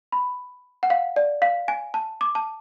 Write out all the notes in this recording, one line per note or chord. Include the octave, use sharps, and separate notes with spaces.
B5
F#5
F5
D5
F5
G#5
A5
D6
A5